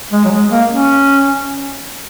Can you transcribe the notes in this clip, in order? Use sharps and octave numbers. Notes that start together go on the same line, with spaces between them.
G#3
F#3
G#3
A#3
C#4